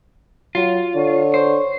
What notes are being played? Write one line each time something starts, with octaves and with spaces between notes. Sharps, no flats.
F#3 F4
D3 C#5
C5